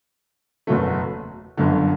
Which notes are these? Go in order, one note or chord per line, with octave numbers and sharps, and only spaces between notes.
F#1 E2 B2 F#3 A3
G1 F#2 D3